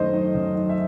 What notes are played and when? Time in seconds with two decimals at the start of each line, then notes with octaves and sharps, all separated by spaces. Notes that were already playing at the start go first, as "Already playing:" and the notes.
Already playing: F#2 D#3 A3 D#4 C5 D#5
0.14 D#4
0.34 F#2
0.56 D#4
0.69 E5